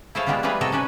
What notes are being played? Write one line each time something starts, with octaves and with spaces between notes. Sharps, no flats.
E4 G#4 A4 C5 C#5 F5
G3 G#3 B3 D4 F4
E3 G3 A3 F4 G#4 B4
C3 D#4 F#4 A4 C#5
C#4 D4 B4 G#5